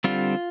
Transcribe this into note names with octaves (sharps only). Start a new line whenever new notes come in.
D3 G3 C4 F4